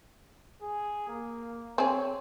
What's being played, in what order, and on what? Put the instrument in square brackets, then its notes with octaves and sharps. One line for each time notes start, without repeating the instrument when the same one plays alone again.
[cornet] G#4
A#3
[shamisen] C4 G#4 [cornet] C#5